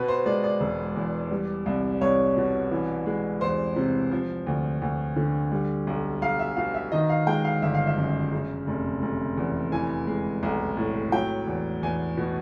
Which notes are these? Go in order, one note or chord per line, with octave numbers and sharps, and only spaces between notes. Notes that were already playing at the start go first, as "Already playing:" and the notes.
Already playing: B2 B4
C5
G#3 D5
D5
E1
E2
G3
C2
C2 C#5
B2
E3
G#3
E2 C5
C3
F3
D2
D2
D3
G3
B1
B1 F5
E5
B2 F5
E5
D#3 D#5
F5
G#3 G5
F5
G1 E5
F5
E5
F#2
C#3
F1
F1
E2
E3 G#5
G#3
B1
A2
F#3 G5
E2
E2 G#5
B2